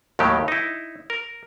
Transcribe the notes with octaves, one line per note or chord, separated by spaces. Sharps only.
D#2 A2 D#3 F#3 G4
D#4 E4
A#4